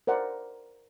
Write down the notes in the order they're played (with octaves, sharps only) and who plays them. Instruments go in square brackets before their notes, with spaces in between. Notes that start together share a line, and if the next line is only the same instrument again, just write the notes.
[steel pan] A#4 C5 D5 F#5